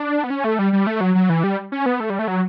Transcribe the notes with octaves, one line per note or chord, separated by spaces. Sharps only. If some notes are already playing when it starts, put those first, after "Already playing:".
Already playing: D4
B3
C#4
A3
G3
G3
A3
F#3
F#3
E3
G3
C#4
B3
A3
G3
A3
F#3